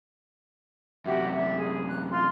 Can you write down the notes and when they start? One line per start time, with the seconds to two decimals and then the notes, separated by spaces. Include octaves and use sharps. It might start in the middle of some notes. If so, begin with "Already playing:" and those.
1.06 F#2 C3 F#4 G4 E5
1.36 D5 E5
1.56 G#4
1.87 F#6
2.11 F4 C6